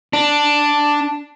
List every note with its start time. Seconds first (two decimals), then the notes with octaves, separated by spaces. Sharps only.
0.13 D4